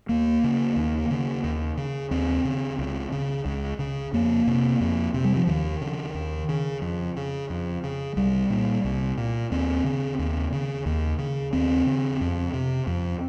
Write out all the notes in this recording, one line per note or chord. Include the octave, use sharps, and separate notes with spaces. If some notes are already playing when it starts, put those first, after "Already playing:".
D#2 A#3
C#3
D#2
C#3
D#2
C#3
D#2 C4
C#3
C#2
C#3
C#2
C#3
F2 A#3
C3
F2
C3
G3
F3
D#2 D#3
C#3
D#2
C#3
F2
C#3
F2
C#3
C2 G3
A#2
C2
A#2
D#2 C4
C#3
D#2
C#3
D#2
C#3
D#2 C4
C#3
F2
C3
F2